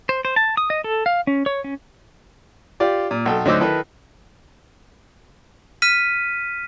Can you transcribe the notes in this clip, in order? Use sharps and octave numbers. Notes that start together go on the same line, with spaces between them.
C5
C5
A5
D#6
D#5
A4
F5
C#4
C#5
C#4
F4 G4 D5
A#2
B1 A4 G5
D2 F#3 D#4 C5 D6 E6
D#3 D#4 E4 A4 B4
F6 B6 D#7